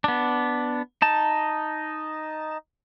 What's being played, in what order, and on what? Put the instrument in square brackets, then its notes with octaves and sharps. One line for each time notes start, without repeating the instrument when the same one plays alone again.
[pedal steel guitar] B3 D4
D#4 A5